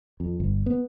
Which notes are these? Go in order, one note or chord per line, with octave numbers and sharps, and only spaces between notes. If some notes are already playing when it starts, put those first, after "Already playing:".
F2
G1
B3